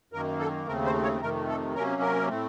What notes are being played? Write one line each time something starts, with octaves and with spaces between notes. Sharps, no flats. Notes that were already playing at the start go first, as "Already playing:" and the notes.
F#2 D#3 A#3 A#4
A4
D#2 C#3 A3 C4 A#4
C5
C#5
F2 C3 D#3 A3 A#4
A4
C3 F#3 A#3 C#4 A#4
A#4
A2 A3 C4